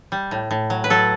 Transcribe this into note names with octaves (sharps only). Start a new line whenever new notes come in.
G3
A2
A2
F#3
B4
F#3 A4